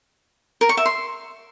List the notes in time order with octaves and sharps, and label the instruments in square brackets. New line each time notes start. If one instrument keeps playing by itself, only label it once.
[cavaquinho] A#4
C#6
E5
C6